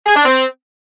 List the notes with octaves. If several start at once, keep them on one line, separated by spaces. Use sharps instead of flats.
G#4
D4
C4